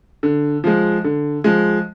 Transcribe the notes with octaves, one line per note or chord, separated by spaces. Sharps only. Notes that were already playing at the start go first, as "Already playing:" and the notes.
D3
F3 G#3
D3
F3 G#3